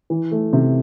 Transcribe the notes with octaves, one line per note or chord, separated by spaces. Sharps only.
E3
A3
C3